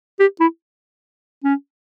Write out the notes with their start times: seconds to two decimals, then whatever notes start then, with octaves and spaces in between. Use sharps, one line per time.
0.19 G4
0.40 E4
1.44 C#4